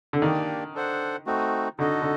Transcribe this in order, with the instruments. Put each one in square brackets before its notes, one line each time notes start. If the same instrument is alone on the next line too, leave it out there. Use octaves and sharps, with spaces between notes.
[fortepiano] D3
[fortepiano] D#3 [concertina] A#3 D4 G4 D5
[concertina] D4 A4 C5 F#5
A3 C4 D#4 F#4
[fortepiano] D3 [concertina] D#4 F#4 A4 D#5
[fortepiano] D3